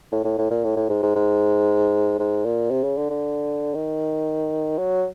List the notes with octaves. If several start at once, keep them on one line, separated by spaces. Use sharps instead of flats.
A2
A2
A2
A#2
A2
A2
G#2
G#2
G#2
G#2
A#2
C3
C#3
D3
D3
D#3
F#3